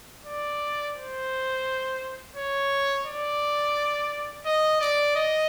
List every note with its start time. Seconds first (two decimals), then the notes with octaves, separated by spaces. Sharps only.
0.26 D5
0.96 C5
2.36 C#5
3.06 D5
4.46 D#5
4.81 D5
5.16 D#5